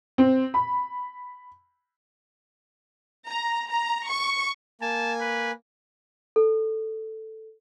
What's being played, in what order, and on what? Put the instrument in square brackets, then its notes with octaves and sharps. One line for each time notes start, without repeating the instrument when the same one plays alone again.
[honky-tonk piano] C4
B5
[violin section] A#5
A#5
C#6
[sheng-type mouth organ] A#3 G#5 [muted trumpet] A5
[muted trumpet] B4
[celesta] A4